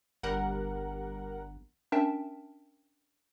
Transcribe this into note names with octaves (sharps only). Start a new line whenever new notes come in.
G1 G3 A#4 F#5
C#4 D4 A#4 E5 G5 A5